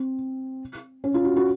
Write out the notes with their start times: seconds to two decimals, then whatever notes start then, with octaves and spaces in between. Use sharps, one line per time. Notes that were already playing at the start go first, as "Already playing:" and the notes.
Already playing: C4
1.04 C#4
1.14 F4
1.25 F#4
1.36 F#4